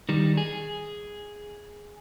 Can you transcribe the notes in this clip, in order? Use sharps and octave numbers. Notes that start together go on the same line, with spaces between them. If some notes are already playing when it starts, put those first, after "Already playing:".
D#3 G3
G#4